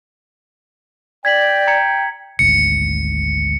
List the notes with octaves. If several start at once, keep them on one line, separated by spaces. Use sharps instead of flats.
D5 G5 G#6 B6 F#7
A#5 G#6 C#7
G#1 D2 G#2 C#7